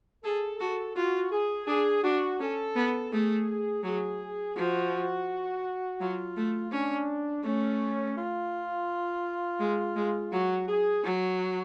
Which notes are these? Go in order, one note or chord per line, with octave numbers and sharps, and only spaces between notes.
G#4 A4
F#4 A4
F4 F#4
G#4
D4 G#4
D4 F#4
C#4 A4
B3
A3 G#4
F#3 G#4
F3 F#4
F#3 F4
A3
C#4 D4
A3 C#4
F4
G#3
G#3
F#3 F#4
G#4
F#3 F#4